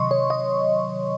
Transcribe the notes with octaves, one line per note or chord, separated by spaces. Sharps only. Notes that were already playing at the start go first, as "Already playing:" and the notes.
Already playing: C3 D#3 F#3 D#5 C6 C#6
C#5
D#5